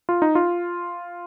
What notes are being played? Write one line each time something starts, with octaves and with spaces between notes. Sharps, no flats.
F4
D#4
F4